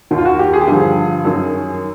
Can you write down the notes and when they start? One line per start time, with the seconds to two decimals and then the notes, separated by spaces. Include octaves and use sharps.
0.11 D#2 D#3
0.18 F4
0.25 F#4
0.39 G4
0.53 G#4
0.61 G4
0.67 G2 D3 F3 G#4
1.25 F#2 D#3